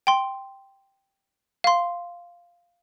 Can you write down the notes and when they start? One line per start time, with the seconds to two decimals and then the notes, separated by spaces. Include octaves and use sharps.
0.07 G5 C6
1.64 F5 C6